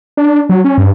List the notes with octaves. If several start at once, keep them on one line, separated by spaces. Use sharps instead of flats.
D4
F#3
C#4
G2